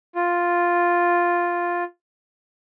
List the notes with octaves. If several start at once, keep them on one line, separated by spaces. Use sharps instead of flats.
F4